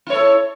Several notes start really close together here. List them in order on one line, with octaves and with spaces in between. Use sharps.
E4 C#5 A4